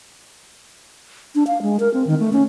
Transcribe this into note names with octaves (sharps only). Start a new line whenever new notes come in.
D4
F5
G#3
A#4
C4
D#3
A3
C#4